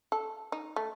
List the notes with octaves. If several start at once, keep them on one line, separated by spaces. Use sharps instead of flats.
A4
D#4
A3